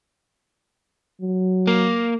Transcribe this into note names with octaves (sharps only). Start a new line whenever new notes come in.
F#3
A#3